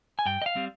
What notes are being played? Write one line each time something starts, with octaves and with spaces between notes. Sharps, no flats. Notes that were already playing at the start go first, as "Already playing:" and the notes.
G#5
G2 G5
D#5
F5
G3 C4